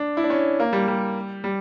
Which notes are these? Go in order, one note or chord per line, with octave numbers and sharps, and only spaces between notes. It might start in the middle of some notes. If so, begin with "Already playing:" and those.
Already playing: D4
E4
D4
C#4
A#3
G3
G3
G3